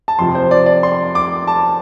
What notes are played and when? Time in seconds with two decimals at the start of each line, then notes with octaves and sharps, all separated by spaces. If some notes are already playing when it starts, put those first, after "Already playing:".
0.08 A5
0.19 F2 C3 F3 C6
0.35 C5
0.51 D5
0.66 D5
0.83 C6
1.15 D6
1.47 A5